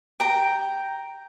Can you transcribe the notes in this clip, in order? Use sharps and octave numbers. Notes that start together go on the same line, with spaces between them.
G5 A#5